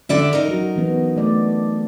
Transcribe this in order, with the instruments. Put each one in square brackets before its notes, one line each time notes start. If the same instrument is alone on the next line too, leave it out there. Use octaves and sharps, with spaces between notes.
[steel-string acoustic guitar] D3 D5 E5 [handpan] C#4
[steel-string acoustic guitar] D#4 A#4
[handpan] F#3 F#4
E3 B3
A3 D5